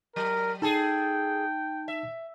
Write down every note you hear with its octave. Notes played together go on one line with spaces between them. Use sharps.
F#3 A#4
D#4 G#4 A4 G5 A5
E5